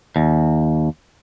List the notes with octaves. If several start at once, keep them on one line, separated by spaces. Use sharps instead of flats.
D#2